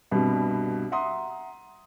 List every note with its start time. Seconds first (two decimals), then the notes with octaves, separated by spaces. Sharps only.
0.12 C2 G2 B2
0.92 E5 F#5 A#5 C6 D#6